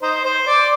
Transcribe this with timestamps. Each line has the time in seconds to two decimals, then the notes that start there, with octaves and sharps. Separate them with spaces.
0.02 D#4 C5
0.25 C5
0.47 D5